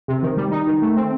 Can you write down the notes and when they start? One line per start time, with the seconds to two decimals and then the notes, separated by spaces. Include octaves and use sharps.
0.08 C3
0.23 D#3
0.37 G3
0.52 D#4
0.67 D#3
0.82 A3
0.96 C4